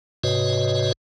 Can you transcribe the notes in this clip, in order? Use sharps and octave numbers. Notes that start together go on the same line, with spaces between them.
G#2 C3 F#4 B4 C#5 D#5